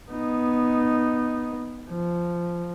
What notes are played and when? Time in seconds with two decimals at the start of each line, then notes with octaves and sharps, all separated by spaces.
0.10 B3 D#4
1.90 F3